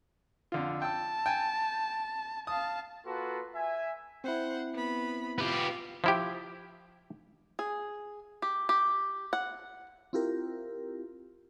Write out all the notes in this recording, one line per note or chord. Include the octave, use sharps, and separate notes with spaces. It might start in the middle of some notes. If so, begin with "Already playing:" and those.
F2 D3 F4
G5 A5 E6
G5 G#5
F5 A5 D#6
A#3 F4 F#4 A4 B4
E5 G#5
C4 E4 C5 F#5
B3 B5
B3 F4 G4 F5
F3 E4 G4
G#4
G4
G4
F#5
C4 E4 F4 G4 A#4